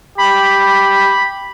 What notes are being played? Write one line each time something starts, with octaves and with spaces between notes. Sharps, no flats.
G4 B5